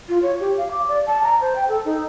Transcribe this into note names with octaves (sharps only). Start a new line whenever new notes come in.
F4
C#5
G4
F5
D6
D5
A5
A#5
C5
G5
A4
D#4